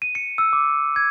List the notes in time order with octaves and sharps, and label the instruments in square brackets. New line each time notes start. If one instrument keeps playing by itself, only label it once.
[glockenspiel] D#7
C#7
E6
D6
G#6